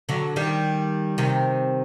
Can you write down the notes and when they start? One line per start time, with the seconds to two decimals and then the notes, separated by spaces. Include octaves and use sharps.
0.09 D3 F#3
0.36 D#3 G3
1.18 C3 D#3